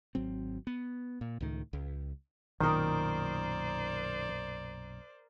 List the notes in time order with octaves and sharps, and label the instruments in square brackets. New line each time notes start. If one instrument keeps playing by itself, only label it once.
[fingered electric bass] G#1 F#3 C4
B3
A#2
C#2 A2 D#3
C#2
[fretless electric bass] B1 F#2 A#2 [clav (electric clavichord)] D#3 [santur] A#4 D#6 [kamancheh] C5 D5